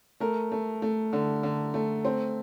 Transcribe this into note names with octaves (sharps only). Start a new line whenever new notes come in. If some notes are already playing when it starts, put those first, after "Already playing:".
A3 A#4
A3
A3
D3
D3
A3
C4